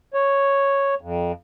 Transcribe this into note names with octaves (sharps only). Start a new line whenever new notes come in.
C#5
F2